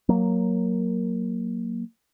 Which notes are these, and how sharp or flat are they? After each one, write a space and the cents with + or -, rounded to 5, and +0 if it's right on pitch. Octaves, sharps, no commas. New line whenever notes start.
F#3 +0 A#3 +0